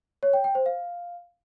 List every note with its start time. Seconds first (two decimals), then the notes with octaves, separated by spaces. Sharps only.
0.23 C#5
0.33 G5
0.44 G5
0.55 C5
0.66 F5